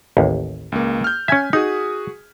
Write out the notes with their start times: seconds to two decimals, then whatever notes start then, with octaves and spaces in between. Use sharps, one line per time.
0.17 A1 D#2
0.72 C#2 A#3
1.04 F6 G6
1.28 C#4 E5 G#5 G#6 B6
1.53 D#4 F#4 G#4 D#6